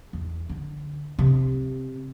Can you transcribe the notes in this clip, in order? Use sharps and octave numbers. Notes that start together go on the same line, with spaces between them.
E2
D3
C3